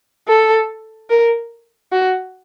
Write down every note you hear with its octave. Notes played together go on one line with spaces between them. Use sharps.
A4
A#4
F#4